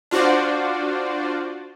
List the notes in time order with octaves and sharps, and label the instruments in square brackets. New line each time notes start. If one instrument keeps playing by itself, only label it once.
[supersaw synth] D4 F4 F#4 C5 D5